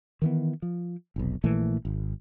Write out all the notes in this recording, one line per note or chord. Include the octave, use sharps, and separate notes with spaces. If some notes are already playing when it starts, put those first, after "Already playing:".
D#3 E3 B3
F3
F1 B1
A#1 A#2 E3 A3
G#1